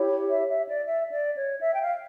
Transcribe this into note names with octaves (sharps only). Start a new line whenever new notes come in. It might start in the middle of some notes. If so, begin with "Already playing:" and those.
Already playing: E4 G4 C#5
E5
E5
D5
E5
D5
C#5
E5
G5
F5